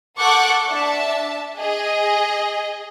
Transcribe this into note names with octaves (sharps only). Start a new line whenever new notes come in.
A4 F#5 C#6 D6 F#6 G6
D4 E5 A5
G#4 D#5